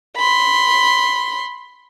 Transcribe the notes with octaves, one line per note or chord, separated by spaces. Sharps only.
B5 C6